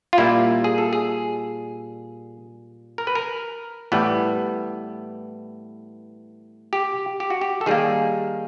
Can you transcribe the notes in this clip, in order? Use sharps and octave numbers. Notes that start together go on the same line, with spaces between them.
F4
A#2 G3 A#3 E4
G#4
A4
G#4
A#4
B4
A#4
A2 E3 G3 B3
G4
G4
F#4
G4
A4
D#3 G3 A#3 G#4